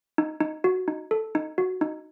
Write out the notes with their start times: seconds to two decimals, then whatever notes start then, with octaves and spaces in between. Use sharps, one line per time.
0.18 D#4
0.41 D#4
0.64 F#4
0.88 D#4
1.11 A4
1.35 D#4
1.58 F#4
1.81 D#4